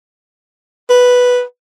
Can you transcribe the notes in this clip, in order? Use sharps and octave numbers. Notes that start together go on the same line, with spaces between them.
B4